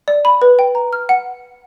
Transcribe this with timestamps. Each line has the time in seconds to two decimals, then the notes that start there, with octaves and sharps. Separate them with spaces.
0.08 D5
0.25 B5
0.42 B4
0.59 G5
0.75 A#5
0.93 F6
1.09 F#5